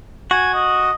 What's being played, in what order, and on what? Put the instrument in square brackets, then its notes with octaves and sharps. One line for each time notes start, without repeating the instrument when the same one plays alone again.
[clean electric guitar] F#4 [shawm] G#5
[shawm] D#5